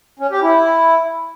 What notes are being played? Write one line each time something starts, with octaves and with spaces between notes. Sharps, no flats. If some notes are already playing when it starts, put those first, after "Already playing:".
C#4
G4
E4